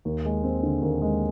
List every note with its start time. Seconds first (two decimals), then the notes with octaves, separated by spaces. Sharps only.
0.05 D#2
0.25 G#3
0.43 C4
0.63 D3
0.82 D#2
1.02 G#3